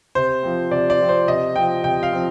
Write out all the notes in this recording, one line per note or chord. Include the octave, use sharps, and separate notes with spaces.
C3 C5
F3 C4
C3 D5
D5
F3 C4
C5
C3 D#5
F3 C4 G5
C3 G5
F5
F3 C4